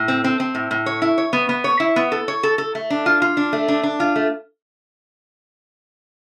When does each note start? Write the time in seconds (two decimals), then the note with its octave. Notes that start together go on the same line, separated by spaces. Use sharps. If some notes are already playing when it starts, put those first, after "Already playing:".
Already playing: A2
0.08 C4
0.24 C4
0.40 C4
0.55 A2
0.71 A2
0.86 C#5
1.02 E4
1.18 C#5
1.33 B3
1.49 B3
1.64 C#5
1.80 E4
1.96 B3
2.12 A4
2.28 C#5
2.43 A4
2.58 A4
2.75 A3
2.90 D4
3.06 F4
3.22 F4
3.37 D4
3.53 A3
3.68 D4
3.83 D4
4.00 F4
4.16 A3